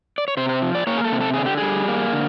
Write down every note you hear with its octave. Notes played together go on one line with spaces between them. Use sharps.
D5
C#5
C3 C5
C5
F3
D5
A#3 C#5
G#4
A4
C3
A4
D3 G#4
G4
G3 G#4
A#3
D3